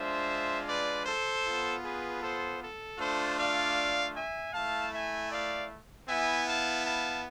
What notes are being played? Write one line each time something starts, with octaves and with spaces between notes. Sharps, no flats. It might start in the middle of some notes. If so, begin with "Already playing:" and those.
Already playing: G#3 D4 F4 C5 E5
B4 D5
A4 C5
B3 F4
G#4 B4
A4 C5
A4
A3 D4 F4 A4 C5
D5 F5
E5 G#5
A3 E4 F5 A5
E5 G#5
D5 F5
B3 E4 E5 G#5
F5 A5
F5 A5